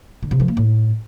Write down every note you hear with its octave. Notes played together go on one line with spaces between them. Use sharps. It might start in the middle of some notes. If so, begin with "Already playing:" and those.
D3
C3
F3
A#3
A2